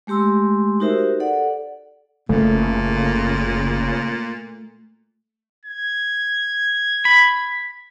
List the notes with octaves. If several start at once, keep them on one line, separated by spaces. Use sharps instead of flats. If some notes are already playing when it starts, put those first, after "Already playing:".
G#3 A3 G4 C6 E6
D#4 F#4 G4 A#4 C5 E5
A4 D5 F#5
F#1 A#2 C#3 A3
G#6
B5